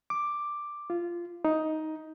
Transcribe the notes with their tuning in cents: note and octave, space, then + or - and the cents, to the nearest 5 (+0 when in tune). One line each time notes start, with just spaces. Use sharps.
D6 +5
F4 -15
D#4 +10